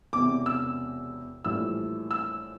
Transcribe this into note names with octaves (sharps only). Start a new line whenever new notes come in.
E1 E2 C3 D6
E6
A#1 A2 E3 G3 E6
E6